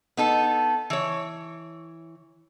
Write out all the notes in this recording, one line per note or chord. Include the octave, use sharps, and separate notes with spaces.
B3 D#4 A4
E3 C#5